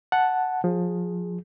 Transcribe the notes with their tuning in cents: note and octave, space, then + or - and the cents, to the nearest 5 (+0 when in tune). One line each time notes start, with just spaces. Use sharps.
F#5 +0 A5 -5
F3 +25 G#4 +0